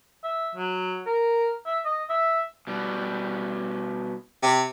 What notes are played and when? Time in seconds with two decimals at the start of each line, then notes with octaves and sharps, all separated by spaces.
0.24 E5
0.55 F#3
1.06 A#4
1.66 E5
1.85 D#5
2.09 E5
2.67 B2 G3
4.43 C3